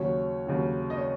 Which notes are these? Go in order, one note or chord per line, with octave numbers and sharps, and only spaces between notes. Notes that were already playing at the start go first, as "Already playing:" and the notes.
Already playing: D#2 C#3 F#3 C#5
D#2 C#3 F#3
D#5
C#5